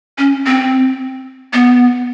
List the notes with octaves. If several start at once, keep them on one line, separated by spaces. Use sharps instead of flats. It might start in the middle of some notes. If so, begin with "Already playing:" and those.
C#4
C4
B3